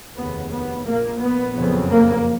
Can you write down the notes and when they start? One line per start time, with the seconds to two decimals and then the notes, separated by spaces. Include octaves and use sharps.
0.17 F1 D#2 C#3 B3
0.51 B3
0.85 A#1 A#2 A#3
1.20 B3
1.55 F#1 F2 C#3
1.90 A#3